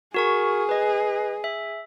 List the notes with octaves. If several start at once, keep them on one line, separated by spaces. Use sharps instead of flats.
F#4 G#4 A#4 C#6
B4 D#5
E5